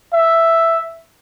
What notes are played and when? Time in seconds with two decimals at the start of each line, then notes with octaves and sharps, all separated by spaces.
0.13 E5